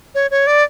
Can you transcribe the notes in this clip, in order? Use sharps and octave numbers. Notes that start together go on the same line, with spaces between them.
C#5
C#5
D5